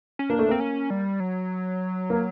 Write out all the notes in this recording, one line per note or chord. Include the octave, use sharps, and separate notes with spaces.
C#4
A#3 D4
A3
A#3 C4
C#4
G3
F#3
A#3